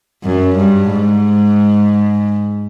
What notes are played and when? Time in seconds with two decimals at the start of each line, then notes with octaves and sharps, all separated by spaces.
0.23 F#2
0.57 G2
0.91 G#2